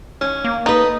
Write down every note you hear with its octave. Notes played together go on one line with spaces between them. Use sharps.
D#2 C#4
A#3
D#4 A4 B4 D#5